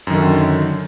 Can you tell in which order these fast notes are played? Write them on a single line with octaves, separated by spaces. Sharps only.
F#2 D#3 D3